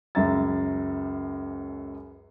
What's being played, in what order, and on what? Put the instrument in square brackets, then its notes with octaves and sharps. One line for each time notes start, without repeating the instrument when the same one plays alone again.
[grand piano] C#2 F#2 E5 A#5 A6